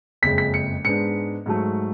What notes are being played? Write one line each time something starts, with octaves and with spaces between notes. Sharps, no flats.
F#1 F2 C#3 G#3 B6
B6
C#7
G#2 G#3 B3 D4 C#7
G#2 F#3 A3